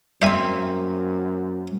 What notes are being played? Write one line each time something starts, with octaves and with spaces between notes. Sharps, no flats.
F#2 A#3 C4 C5 E5 G#5